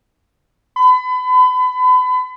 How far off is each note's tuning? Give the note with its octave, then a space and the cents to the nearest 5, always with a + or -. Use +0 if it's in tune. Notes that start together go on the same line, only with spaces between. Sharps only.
B5 +35